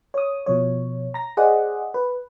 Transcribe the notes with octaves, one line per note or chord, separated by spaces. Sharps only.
C#5 D#6
B2 F3 C#5
A#5 A#6
G#4 C5 D5 D#5 F#5
B4